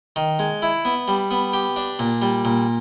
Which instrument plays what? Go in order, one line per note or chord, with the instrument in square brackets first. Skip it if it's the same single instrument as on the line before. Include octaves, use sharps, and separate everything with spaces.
[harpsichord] D#3
G#3
E4
B3
G3
B3
G4
D4
A#2
G3
A#2